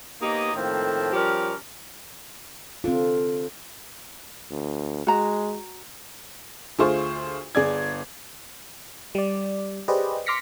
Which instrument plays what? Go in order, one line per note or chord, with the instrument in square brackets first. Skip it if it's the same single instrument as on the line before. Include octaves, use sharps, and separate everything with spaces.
[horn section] A#3 B3 D#4 G4 C#5 D#5
A2 D#3 F3 A3 A#3 C4
F3 G3 C#4 G4 A#4
[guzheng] D3 [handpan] C4 F4
[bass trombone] D2
[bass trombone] G#3 [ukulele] F#4 A#5
[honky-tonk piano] D2 A3 F4 G#4 C5 C#6
G1 G#4 D5 G#6
[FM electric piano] G3 D5
G4 G#4 B4 C5 D5 D#5
C6 D6 F6 A#6 B6 C#7